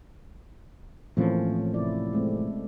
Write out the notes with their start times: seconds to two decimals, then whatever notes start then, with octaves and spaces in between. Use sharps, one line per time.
1.17 A2 E3 F3 A#3 C4 C#4
1.74 C3 E4 D5
2.13 G#3 A3 C4